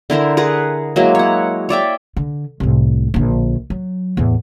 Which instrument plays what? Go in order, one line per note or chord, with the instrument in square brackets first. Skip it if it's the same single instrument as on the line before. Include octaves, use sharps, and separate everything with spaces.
[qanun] D3 E4 A#4 C5
G#4 A#4 B4 F#5
F#3 G#3 A#3 E4
C#5 F#5
C#5 D5 E5 G5
[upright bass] D3
C2 A2
A#1 D3
F#3
E2 A2